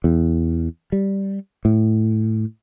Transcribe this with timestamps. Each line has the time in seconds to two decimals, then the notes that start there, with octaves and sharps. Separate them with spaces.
0.04 E2
0.92 G3
1.65 A2